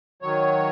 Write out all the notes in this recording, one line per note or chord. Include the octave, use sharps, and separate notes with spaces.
D#3 F#3 C#5